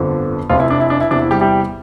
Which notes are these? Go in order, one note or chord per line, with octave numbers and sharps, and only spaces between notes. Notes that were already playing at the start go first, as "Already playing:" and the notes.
Already playing: G1 F2 D3 F3
F1 F2 C3 F3 F4
E4
D4
E4
D4
E4
E2 C3 E3 D4
E4
G3 G4
G3 G4